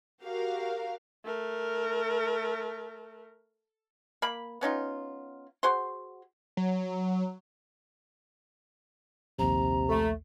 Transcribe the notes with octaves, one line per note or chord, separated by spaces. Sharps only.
F#4 G4 A#4 F5
A3 A#4
A#3 B5
B3 C#4 D#4 F4
F#4 G#4 C5 C6
F#3
A#1 D#2 C3 A#5
A3